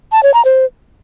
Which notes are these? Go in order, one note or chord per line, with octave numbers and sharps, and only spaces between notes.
A5
C#5
A#5
C5